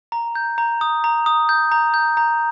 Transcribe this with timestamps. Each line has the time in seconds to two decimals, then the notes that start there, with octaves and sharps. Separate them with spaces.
0.12 A#5
0.35 G6
0.58 A#5
0.81 D#6
1.04 A#5
1.26 D#6
1.49 G6
1.72 A#5
1.94 G6
2.17 A#5